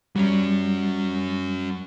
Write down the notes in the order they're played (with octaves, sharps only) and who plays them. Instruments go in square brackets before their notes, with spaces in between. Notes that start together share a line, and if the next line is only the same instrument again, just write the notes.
[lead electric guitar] F#3 C#4 [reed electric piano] G3